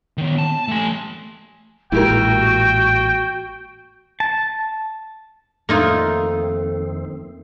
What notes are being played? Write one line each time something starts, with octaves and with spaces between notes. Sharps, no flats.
D#3 B3
A5
A3 G#5
A1 A#2 G#3 E4 F#4 G4 A#4 G5
A5
F2 D#3 A3 A#3 C4 D#4 F4